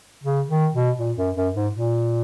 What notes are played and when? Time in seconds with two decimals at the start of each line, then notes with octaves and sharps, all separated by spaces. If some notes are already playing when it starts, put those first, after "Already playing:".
0.24 C#3
0.49 D#3
0.74 B2
0.98 A#2
1.17 F#2
1.36 F#2
1.55 G#2
1.74 A#2